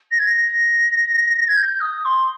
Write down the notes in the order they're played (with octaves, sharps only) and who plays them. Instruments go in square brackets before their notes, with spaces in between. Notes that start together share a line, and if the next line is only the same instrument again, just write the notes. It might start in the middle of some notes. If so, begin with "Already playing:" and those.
[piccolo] A#6
G#6
A#6
A#6
G#6
G6
D#6
C6